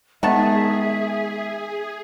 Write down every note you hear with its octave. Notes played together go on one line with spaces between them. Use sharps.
D#3 G#3 B3 G#4 E5 F#5 A5